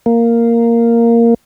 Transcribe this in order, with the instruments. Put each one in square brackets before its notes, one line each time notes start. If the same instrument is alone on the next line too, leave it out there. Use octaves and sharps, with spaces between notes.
[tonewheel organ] A#3